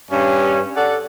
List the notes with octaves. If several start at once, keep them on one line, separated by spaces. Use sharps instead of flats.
G2 C#4
A4 D5 F#5